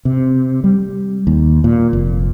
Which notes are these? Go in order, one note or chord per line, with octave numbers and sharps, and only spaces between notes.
C3
G3
D#2
A#2
F1